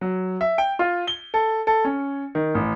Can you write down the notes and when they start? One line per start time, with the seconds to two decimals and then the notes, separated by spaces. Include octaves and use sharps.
0.01 F#3
0.41 E5
0.58 G5
0.79 F4
1.07 G7
1.34 A4
1.67 A4
1.85 C#4
2.35 D#3
2.55 A1